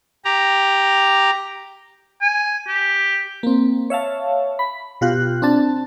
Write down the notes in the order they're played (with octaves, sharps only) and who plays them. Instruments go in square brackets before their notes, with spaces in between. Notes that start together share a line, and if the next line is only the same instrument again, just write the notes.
[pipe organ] G4 A#5
[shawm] G#5
G4
[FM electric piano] A#3 C4
C#5 E5 F5 A5
B5
B2 F4 G4 F#6
C4 D4 A5